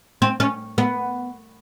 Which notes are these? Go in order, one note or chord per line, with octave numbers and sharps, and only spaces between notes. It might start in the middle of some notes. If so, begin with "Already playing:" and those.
C4
C#4
B3